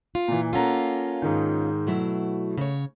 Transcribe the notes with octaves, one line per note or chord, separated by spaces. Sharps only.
F4
A#2 E3
A#3 C#4 F4 A4 F#5 A#5
G#2 D#3
B2 F#3 A3 E4
C#3 C#5